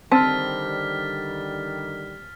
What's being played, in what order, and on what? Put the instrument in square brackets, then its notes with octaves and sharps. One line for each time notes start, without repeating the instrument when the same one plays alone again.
[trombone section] D3 D#3 G3 [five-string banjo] C4 [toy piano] A5 [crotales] F6 A6 B6